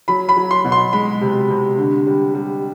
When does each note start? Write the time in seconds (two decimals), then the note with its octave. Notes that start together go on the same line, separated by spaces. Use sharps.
0.08 F#3 B5
0.29 B5
0.37 F#3
0.51 C6
0.65 B2
0.72 C6
0.93 G#3 B5
1.21 C3
1.50 C3
1.78 D3
2.07 G3
2.35 G3